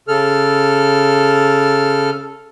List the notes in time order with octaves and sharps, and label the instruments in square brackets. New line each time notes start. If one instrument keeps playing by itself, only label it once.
[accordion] C#3 A4 F6